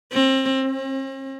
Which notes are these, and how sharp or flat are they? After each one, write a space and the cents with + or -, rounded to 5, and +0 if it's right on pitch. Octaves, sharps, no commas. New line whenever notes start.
C4 +25
C4 +45